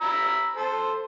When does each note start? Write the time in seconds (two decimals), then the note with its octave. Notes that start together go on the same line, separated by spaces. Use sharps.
0.01 A#5 B5 E6
0.56 A4 C5